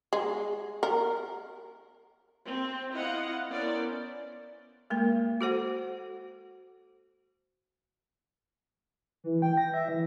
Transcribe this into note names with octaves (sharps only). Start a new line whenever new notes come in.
G#3
A#4
C4
E4 F4 D#5 F5 F#5
B3 C#4 E4 A#4 C5 D5
G#3 A#3 A#4
F#4 A4 C5 F#5
E3
G5
A#6
E5
E3